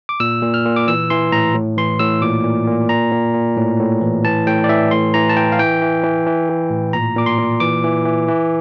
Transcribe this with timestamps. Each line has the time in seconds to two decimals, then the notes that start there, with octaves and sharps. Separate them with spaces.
0.09 D6
0.20 A#2 E6
0.43 A#2
0.54 F6
0.65 A#2
0.76 D6
0.88 E3 E6
1.10 E3 C6
1.32 A2 A#5
1.55 A2
1.77 E3 C6
1.99 A2 E6
2.22 A#2 D6
2.44 A#2
2.67 A#2
2.89 A#2 A#5
3.12 A#2
3.34 A#2
3.57 A2
3.79 A2
4.01 E3
4.25 E3 A5
4.47 A2 G5
4.64 D5
4.69 E3 E5
4.91 A2 C6
5.14 E3 A#5
5.29 A5
5.36 E3 G5
5.52 F5
5.59 E3 G5
5.82 E3
6.04 E3
6.27 E3
6.49 E3
6.70 A2
6.93 A#2 A#5
7.16 A#2 D6
7.26 C6
7.38 A#2
7.60 E3 D6
7.84 E3
8.05 E3
8.28 E3